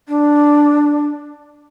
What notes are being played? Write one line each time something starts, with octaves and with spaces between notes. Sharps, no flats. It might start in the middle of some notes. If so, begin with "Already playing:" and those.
D4